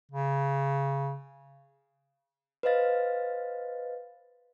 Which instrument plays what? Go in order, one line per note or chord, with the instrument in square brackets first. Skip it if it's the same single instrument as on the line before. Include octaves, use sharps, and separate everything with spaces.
[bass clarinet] C#3
[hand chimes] B4 C5 D#5 F5 A6